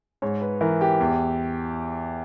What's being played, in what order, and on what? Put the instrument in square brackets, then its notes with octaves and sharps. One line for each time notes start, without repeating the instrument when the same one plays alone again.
[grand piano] G#2 C#5
B4
E3 A#4
G4
E2